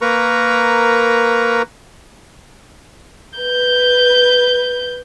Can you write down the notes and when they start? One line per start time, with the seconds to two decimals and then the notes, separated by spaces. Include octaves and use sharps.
0.01 A#3 A#4 B4 A#5 C#6
3.38 B4 G6